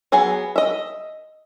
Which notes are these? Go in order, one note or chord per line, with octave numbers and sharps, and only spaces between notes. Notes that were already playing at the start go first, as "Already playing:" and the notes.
F#3 B3 G#4 G#5
D#5 E5